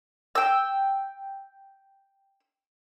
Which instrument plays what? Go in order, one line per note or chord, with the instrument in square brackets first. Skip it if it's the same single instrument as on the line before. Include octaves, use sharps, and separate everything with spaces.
[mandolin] G5 E6